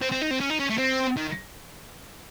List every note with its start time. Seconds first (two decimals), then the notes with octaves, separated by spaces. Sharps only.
0.02 C4
0.12 C4
0.22 D#4
0.31 C4
0.40 C#4
0.50 D#4
0.59 C#4
0.70 A3
0.78 C4
1.17 D#3